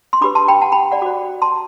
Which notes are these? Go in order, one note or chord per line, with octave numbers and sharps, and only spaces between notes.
C6
D4 G4 B4 B5 D6
A5 C6
G5 B5
F#5 A5
G5 B5
D5 F#5
F#4 C5 B5 D6
A5 C6